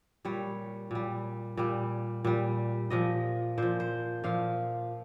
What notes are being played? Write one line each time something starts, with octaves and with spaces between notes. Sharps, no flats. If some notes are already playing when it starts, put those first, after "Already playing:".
A#2 G3 C#5
A#2 G3
A#2 G3
A#2 G3
A#2 F3 D#5
A#2 F3 C5
C5
A#2 F3 F5